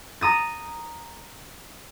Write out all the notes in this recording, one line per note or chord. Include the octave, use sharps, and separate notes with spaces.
A#5 D#6 A6